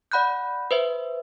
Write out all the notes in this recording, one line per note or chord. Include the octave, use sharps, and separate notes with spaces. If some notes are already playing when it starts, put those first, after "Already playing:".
D5 F#5 B5 F#6 G6
B4 C5 E5